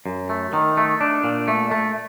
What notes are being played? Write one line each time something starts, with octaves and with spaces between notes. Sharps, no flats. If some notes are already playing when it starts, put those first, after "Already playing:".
F#2
A3
D#3
A3
D4
A#2
A3
A3